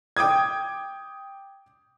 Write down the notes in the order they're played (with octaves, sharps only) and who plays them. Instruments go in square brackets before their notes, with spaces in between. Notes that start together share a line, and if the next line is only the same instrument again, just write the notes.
[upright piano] G5 D6 D#6 G#6